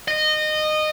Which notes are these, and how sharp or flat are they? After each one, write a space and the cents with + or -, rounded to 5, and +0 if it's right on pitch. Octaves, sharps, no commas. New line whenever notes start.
D#5 -20